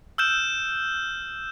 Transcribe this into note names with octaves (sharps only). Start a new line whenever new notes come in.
E6 F6 G6 E7